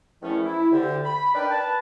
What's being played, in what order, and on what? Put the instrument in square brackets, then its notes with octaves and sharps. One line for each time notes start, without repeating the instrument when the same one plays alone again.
[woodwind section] E2 D#3 F3 A3 C#4 E4
E4
D2 D3 G4
B5
D4 D#4 A#4 B4 D5 G5
B4 A5